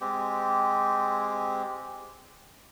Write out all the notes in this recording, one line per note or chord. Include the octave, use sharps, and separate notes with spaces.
G#3 C4 G4